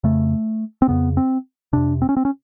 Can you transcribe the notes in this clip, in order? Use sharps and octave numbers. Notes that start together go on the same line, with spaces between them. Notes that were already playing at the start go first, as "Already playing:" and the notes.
F2 C#3 A3
C4
F2 C#3 B3
C4
F2 C3 D4
C4
C#4
C4
C#4